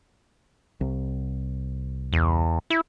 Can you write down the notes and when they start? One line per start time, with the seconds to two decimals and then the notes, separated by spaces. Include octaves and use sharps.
0.81 C2
2.13 E2
2.70 E4